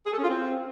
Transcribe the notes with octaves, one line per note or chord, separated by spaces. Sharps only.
G#4
A4
C#4
F4
C4